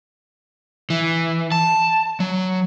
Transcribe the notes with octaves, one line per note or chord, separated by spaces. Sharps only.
E3
A5
F#3